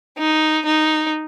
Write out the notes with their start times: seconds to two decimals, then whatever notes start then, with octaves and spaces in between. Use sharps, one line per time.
0.18 D#4
0.66 D#4